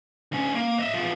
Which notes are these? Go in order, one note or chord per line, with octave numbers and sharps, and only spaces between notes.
D2 C#4
A#3
D#5 E5
E2 F3